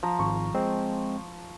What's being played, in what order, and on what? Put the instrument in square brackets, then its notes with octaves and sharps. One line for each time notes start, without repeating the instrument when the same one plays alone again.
[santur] F3 A#5
[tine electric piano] G#1 [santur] C#6
[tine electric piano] G#3 C4